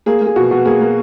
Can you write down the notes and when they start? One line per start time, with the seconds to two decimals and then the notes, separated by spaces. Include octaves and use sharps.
0.06 A#3 G#4
0.21 A#3
0.27 G#4
0.36 B2 F#4
0.51 B2
0.65 A#3 G#4
0.80 A#3